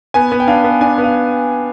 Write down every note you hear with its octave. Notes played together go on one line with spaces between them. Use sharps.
B3 G#5
B3
G5
D4 F5
B3
D4 G#5
B3
F5